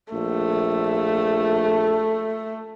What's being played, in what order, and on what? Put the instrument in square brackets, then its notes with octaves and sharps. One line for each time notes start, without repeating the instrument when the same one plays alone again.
[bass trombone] A#1 [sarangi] A3